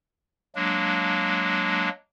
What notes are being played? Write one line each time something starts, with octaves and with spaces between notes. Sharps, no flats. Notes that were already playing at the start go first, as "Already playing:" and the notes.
F#3 G#3 A#3 D4